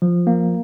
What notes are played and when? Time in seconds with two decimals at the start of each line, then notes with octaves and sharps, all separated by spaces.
0.02 F3
0.27 A#3